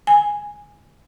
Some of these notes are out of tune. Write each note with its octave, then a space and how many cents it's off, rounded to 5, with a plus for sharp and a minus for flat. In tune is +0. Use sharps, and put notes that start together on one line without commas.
G#5 -5